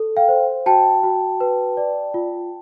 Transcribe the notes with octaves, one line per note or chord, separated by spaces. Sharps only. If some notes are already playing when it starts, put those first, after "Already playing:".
Already playing: A4
F5 G5
C5
F#4 G5 A5
F#4
B4
D5
F4